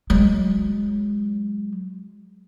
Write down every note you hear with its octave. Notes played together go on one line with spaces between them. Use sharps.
F#3 G#3